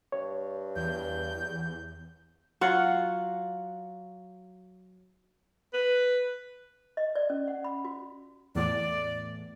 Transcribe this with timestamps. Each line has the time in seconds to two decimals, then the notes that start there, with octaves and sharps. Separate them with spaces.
0.12 G2 C#5
0.76 E2 G6
2.61 F#3 F4 F#5
5.74 B4
6.97 D#5
7.16 D5
7.30 C#4
7.48 F#5
7.64 B5
7.85 F#4
8.55 E2 A2 D5